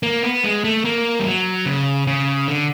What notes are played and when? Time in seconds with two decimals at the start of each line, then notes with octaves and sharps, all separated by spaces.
0.03 A#3
0.23 B3
0.44 G#3
0.64 A3
0.85 A#3
1.20 G3
1.26 F#3
1.66 C#3
2.07 C#3
2.48 D3